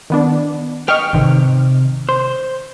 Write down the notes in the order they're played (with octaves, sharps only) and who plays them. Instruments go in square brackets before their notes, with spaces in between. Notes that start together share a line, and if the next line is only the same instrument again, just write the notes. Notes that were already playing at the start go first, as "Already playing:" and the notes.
[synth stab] D#3 B3 D4
[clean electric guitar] B4 G5 [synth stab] D#5 C#6 F6
[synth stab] G#1 D#3 [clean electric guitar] C3
[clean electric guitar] C5